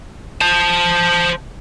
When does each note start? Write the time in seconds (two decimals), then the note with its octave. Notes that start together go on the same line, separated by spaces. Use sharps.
0.41 C5 A5